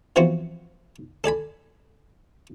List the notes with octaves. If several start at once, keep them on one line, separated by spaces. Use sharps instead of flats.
E3 F3 B3 C4 F4 F#4
A4 D5 G#5 B5